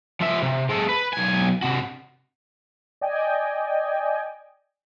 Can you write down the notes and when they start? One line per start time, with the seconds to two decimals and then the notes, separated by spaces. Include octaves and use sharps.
0.21 F3 E5
0.42 C3
0.69 G#3 A4
0.89 B4
1.13 B1 G#5
1.62 C3 F#4
3.01 D5 D#5 G5 G#5